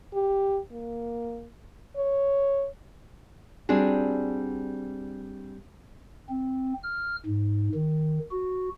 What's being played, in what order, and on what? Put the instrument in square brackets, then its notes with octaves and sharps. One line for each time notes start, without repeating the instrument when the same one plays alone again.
[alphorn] G4
A#3
C#5
[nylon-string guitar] G3 C4 D4 F#4 G#4
[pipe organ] C4
F6
G#2
D#3
F#4